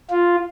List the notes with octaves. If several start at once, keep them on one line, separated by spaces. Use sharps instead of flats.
F4